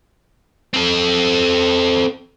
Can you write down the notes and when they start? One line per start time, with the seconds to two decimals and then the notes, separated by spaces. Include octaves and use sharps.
0.74 C4 A4